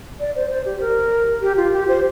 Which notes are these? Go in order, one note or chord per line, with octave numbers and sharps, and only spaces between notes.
D5
C5
C5
G4
A#4
G4
F4
G4
C5